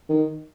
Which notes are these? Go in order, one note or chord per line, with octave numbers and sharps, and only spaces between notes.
D#3